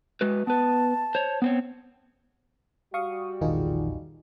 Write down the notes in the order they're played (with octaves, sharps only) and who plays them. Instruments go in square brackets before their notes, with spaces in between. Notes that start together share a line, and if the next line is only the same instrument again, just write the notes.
[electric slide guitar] G#3 F#4 B4
[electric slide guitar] B3 B4 [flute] A5
[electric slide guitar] C5 C#5
B3 C4 C#5
[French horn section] G3 F#4 [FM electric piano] F5 C#6 D#6
[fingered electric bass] E1 A#1 [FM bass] D#3 [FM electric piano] D#4 F4 G#4